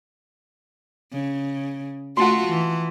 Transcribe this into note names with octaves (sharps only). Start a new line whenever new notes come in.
C#3
A3 F4 F#4 F#5 A5 C6
E3